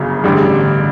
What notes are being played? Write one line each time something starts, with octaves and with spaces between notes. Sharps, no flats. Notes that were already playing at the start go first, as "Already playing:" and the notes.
Already playing: G1 F#2 C#3
A1 G2 D3